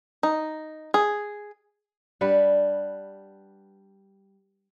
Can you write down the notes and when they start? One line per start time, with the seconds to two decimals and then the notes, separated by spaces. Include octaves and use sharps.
0.23 D#4
0.94 G#4
2.21 G3 D4 B4 F#5